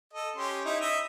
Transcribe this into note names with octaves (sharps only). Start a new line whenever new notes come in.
A4 D#5
C#4 G4 C6
D#4 E4
D#5 E5